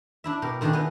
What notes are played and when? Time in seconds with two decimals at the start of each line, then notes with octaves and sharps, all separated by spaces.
0.24 D4 E4 E5
0.42 B2 G4 A#4
0.61 A#2 D#3 A3 D4 D#4 G#4
0.73 B3 E4 D#5 G#5